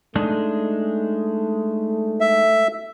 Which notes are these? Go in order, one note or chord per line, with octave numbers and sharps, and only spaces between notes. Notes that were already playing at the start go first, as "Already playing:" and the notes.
G#3 A3 D4 D#4
E5